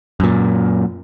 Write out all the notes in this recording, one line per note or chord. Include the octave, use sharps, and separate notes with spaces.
F#2 A#2